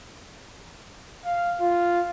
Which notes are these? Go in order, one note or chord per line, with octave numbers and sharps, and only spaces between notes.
F5
F4